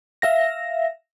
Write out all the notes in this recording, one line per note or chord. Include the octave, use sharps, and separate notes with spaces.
E5 F5 A#6